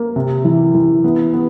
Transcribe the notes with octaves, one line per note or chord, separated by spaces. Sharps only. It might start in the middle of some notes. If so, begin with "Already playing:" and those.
Already playing: A#3
C3
E3
E3
B3
B3